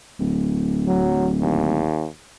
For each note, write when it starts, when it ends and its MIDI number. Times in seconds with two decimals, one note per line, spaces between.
0.20 1.85 26
0.88 1.29 54
1.41 2.08 39